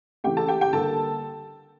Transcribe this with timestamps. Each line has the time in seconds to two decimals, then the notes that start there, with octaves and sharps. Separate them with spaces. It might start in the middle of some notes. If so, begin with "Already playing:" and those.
0.24 C#3 E3 A3 G4 G5
0.37 A4 A5
0.48 G4 G5
0.61 G4 G5
0.73 D3 G3 A#3 A4 A5